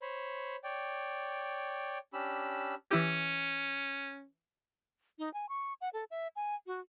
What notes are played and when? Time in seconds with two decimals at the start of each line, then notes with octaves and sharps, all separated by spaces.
0.02 C5 C#5 B5
0.64 C#5 D5 G5
2.13 C#4 D4 G4 B5 E6
2.91 E3 C#4 E4 G4
5.19 D#4
5.34 G#5
5.49 C#6
5.81 F#5
5.93 A4
6.11 E5
6.36 G#5
6.66 F#4